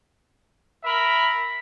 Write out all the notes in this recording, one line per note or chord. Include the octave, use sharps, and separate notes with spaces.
A#4 E5 B5